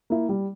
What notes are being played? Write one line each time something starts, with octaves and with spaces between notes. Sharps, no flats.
A#3 E4
G3